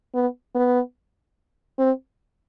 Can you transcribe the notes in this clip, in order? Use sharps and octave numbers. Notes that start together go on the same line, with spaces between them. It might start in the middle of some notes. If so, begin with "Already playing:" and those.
B3
B3
C4